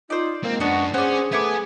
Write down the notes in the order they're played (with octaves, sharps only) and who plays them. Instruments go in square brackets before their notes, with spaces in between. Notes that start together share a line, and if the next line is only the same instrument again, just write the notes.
[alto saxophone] D#4 [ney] F4 [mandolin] C5 D5
[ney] G#3 [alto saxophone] A#3 [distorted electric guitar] C4
[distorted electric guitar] F#2 [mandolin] B3 F#4 [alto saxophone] D4
[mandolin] B3 D5 [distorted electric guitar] C#4 [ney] G#4 [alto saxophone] C5
[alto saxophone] A3 [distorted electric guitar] B3 B4 [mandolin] E5 G#5 D6